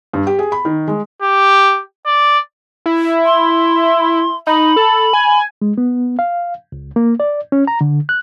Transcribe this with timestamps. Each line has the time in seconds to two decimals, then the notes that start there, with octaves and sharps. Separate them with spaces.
0.13 G2
0.27 G4
0.39 G#4
0.52 B5
0.65 D#3
0.88 G#3
1.23 G4
2.06 D5
2.86 E4
3.25 C6
4.47 D#4 B5
4.76 A4
5.13 G#5
5.62 G#3
5.78 B3
6.19 F5
6.72 C#2
6.96 A#3
7.20 D5
7.52 C#4
7.67 A#5
7.81 D3
8.09 F#6